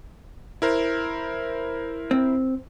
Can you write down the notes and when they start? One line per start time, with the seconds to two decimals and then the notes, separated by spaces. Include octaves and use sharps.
0.62 E4 A#4 C5
2.11 C4